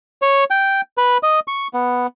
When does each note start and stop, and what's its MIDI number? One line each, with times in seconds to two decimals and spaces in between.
0.22 0.44 73
0.50 0.81 79
0.98 1.18 71
1.23 1.40 75
1.48 1.67 85
1.74 2.07 59